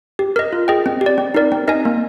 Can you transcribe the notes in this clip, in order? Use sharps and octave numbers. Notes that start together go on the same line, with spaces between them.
G4
A#4 D#5
F4
G#4 D#5 G5
C4
G4
D5
C4
D#4 A#4 D5
C4
D#4 A#4 D#5 G#5
A#3